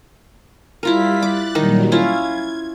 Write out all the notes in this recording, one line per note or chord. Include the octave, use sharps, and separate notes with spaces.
G3 E4 F4 A#4 B6
D6 F#6 A6
A#2 D#3 F#3 G3 D#4
C#4 E4 F4 G#6